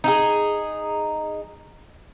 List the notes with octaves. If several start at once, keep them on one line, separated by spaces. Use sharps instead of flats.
D#4 E4 G#4